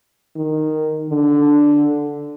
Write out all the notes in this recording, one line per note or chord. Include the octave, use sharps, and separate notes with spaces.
D#3
D3